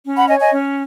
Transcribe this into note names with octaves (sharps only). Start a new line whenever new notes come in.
C#4
F#5 B5
C#5 D#5 G#5
D#5 G#5
C#4